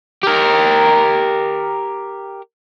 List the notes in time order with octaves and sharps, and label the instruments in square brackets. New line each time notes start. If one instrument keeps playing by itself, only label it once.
[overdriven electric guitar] G4 A#4